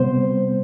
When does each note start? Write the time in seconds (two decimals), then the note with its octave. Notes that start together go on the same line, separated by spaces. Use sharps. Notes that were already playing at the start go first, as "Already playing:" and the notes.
Already playing: C3 G3 B3 C5